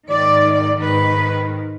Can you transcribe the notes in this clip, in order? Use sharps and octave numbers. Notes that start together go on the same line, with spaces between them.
G#2 D#3 D5
G#2 D#3 B4